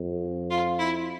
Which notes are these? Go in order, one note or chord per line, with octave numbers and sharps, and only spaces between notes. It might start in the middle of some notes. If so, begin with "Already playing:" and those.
Already playing: F2
F4
E4